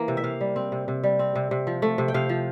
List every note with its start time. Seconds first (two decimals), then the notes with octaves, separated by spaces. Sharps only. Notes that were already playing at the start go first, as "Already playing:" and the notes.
Already playing: E3 A#3
0.08 C3
0.17 E5
0.24 C3 F5
0.41 G3
0.56 C4
0.72 C3
0.88 C3
1.03 G3
1.19 C4
1.35 C3
1.51 C3
1.67 F3
1.82 A3
1.98 C3
2.08 G5
2.14 C3 F5
2.29 F3